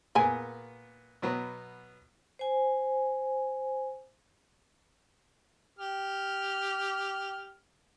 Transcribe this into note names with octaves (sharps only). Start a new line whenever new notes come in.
A#2 B3 G#4 A#4 G#5
B2 F#3 B3
C5 G#5
G4 F6